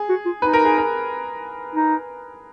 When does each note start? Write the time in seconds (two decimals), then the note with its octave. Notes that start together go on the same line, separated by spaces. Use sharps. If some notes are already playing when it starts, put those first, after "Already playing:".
Already playing: G#4
0.09 F#4
0.25 F4
0.42 D#4 B4
0.53 A#4
0.65 G#4
0.78 A#4
1.75 D#4